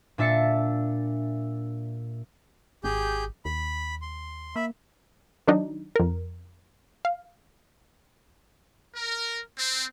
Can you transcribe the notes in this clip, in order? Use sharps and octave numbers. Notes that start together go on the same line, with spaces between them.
A#2 D4 E5 A6 C#7
G#1 G4 G#4 G6
D#2 B5
C6
A#3 E5 B5
D#3 F#3 D4 D#4
F2 A#4
F5
A#4
C4